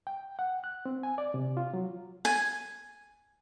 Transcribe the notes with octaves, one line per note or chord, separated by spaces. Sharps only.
G5
F#5
F#6
C4
G#5
D5
C3
F4
F#3
G#5